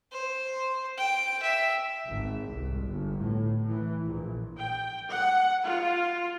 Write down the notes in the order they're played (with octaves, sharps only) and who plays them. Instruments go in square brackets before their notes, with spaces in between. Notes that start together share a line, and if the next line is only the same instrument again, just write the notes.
[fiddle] C5
G5
E5
[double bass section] G#1
C2
G1
A2
E3
A#1
[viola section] G5
F#5
F4